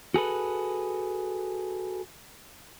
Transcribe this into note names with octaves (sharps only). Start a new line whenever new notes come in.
F#4 G#4 A4 B4